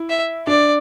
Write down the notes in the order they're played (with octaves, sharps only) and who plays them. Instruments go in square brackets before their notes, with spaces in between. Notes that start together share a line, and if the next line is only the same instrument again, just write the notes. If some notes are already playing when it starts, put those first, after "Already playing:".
Already playing: [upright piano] E4
[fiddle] E5
[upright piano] D4 [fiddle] D5